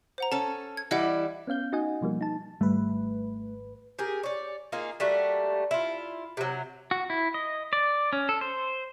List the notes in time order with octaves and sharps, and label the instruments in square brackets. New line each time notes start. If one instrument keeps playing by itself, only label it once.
[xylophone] C5 F#5 A#5
[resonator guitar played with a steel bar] C#4 A4 [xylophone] A5
[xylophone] G#6
[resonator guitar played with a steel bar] E3 G3 E4 [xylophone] D#5 F#5
[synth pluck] B3 C#4 F5 G6
D#4 F#4 D#5 F#5 G#5
B2 F3 G3 A#3
D#4 A5
[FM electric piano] G#1 B4 [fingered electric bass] G3 [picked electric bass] A3
[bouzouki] G4 G#4 A#4
C#5 D5
A#3 D#4 F4 G#4
G3 A3 A#3 F#4
E4 F4
C3 F#3
[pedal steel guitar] F#4
E4
D#5
D5
C#4
A4
C5